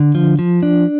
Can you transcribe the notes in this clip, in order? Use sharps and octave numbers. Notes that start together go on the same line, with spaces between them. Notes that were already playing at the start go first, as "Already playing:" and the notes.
Already playing: D3
F3
F3
D4